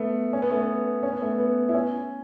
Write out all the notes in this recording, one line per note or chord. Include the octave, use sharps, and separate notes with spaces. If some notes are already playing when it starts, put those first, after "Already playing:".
Already playing: A3 B3
C#4
B3
A3
B3
C#4
B3
A3
B3
E4
C#4